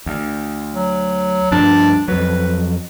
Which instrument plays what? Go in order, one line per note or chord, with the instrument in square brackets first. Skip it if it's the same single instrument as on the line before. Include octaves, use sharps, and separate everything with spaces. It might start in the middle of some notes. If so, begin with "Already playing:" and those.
[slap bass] D2
[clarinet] F#3
[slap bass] D2 G2 F3 [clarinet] D4
[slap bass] F2 F#3 [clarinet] B4